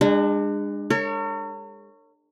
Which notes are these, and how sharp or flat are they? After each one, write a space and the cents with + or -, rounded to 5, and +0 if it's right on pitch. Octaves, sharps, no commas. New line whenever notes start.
G#3 -30 D4 +25
A#4 -45 C#5 +0